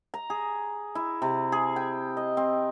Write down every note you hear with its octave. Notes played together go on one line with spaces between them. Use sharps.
A#5
G#4
E4
C3
G#4
G5
D#5
C4